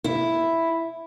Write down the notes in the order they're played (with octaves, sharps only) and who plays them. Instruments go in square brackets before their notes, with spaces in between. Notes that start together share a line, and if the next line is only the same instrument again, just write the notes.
[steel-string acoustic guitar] E4